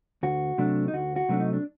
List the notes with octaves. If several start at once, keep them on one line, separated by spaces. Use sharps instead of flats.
D2 F#4
C3 F#3 A3 D4
D#4
D2 F#4
F#4
C3 F#3 A3 D4
D#4
D4